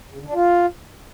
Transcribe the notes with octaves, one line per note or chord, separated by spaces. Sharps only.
C#3
D3
D4
F4